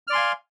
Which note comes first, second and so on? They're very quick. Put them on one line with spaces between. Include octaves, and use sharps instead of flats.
F6 D5 C6 G#5 F5